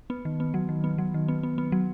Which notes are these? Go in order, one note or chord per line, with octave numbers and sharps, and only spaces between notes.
B3
D#3
B3
F#3
D#3
B3
F#3
D#3
B3
B3
B3
F#3